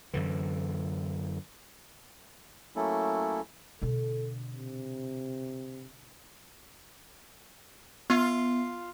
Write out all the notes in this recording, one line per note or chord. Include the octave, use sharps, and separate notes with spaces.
F#2 D3 E3
F#3 A3 A#3 C#4 E4 A4
B2 D3 A4
C3
B3 F4